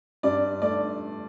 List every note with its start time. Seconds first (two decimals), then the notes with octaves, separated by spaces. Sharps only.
0.23 G2 D5
0.62 A3 D5